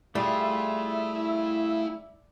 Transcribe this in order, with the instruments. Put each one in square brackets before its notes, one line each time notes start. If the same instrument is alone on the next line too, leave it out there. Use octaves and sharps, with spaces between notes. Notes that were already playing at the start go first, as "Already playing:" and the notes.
[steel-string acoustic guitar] G3 [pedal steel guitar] A3 F4 G#4 [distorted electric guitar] E4 A5 [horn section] E5